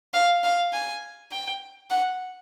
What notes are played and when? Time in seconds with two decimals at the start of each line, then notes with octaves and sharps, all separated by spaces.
0.14 F5
0.44 F5
0.73 G#5
1.32 G5
1.90 F#5